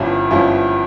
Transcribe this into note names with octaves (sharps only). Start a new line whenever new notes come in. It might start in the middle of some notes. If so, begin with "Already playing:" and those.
Already playing: G1 G2 F3 C#4 E4
G1 G2 F3 C#4 E4